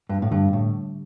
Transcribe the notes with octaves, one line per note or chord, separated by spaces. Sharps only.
G2
A2
G2 D3 G3
A2